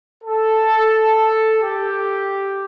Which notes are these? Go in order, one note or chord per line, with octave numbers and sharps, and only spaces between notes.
A4
G4